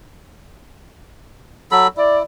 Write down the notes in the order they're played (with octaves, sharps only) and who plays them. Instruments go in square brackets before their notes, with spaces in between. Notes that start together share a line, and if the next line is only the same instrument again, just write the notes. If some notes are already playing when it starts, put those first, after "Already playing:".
[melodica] F#3 A4 B5
[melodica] E4 [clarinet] D5